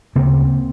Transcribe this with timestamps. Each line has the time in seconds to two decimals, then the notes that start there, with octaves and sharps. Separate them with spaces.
0.16 D2 C#3 A#3 C4